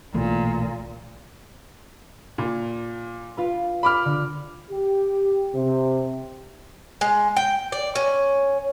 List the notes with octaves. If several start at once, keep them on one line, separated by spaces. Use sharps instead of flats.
B1 A#2 E3 A3
A#2
F4 B4
B5 D6 F6
D3
G4
C3
G#3
G5
D5
C#4